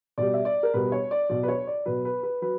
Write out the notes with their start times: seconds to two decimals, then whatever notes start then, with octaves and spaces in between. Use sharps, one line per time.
0.18 B2 G3 D5
0.34 E5
0.45 D5
0.63 A#4
0.74 B2 G3 B4
0.92 C#5
1.11 D5
1.29 B2 F#3 D5
1.43 B4
1.48 C#5
1.67 D5
1.86 B2 F#3 B4
2.05 B4
2.23 B4
2.42 F#3 B4